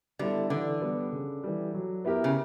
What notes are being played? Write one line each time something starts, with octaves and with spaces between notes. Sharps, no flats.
D3 G3 B3 E4 A4
D3 E3
G3 B3
C#3
E3 G3
F#3
B3 E4 G4 A#4
C#3